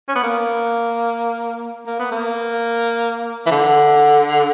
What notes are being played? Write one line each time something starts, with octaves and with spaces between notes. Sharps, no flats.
C#4
B3
A#3
A#3
B3
A#3
E3
D3